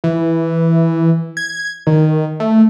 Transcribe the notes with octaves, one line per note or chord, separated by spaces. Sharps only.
E3
G#6
D#3
A3